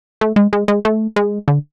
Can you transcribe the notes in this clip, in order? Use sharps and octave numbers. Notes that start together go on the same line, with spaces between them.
A3
G#3
G#3
G#3
A3
G#3
D3